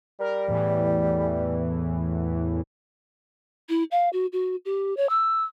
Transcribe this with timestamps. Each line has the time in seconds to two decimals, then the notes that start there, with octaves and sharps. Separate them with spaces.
0.20 G3 A#4
0.47 E2 A2 E3
3.69 E4
3.91 F5
4.13 F#4
4.33 F#4
4.65 G4
4.97 C#5
5.09 E6